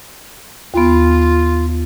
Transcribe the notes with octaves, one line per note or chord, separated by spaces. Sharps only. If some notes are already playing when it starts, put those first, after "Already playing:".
D#2 B3 F4